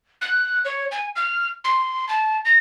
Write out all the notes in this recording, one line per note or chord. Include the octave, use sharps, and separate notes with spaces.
F#6
C#5
G#5
F6
C6
A5
A#6